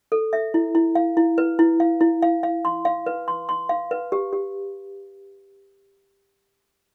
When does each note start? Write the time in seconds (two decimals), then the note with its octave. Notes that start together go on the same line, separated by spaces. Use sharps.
0.12 A4
0.33 E5
0.54 E4
0.75 E4
0.95 F5
1.17 E4
1.38 B4
1.59 E4
1.80 F5
2.01 E4
2.22 F5
2.43 F5
2.65 C6
2.85 F5
3.06 B4
3.28 C6
3.49 C6
3.69 F5
3.91 B4
4.12 G4
4.33 G4